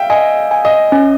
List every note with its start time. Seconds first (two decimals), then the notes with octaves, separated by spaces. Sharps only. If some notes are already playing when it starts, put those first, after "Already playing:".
Already playing: E5 F5 G5
0.10 D#5 G#5
0.51 G#5
0.65 D#5
0.92 C#4